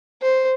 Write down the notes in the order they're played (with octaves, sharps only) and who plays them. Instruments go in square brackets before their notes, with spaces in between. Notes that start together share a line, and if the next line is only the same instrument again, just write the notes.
[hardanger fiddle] C5